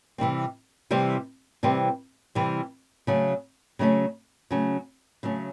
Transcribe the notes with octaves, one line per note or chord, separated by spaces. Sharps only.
C3 E3 G3 C4
C3 E3 G3 C4
C3 E3 G3 C4
C3 E3 G3 C4
C#3 F#3 A3 C#4
C#3 F#3 A3 C#4
C#3 F#3 A3 C#4
C#3 F#3 A3 C#4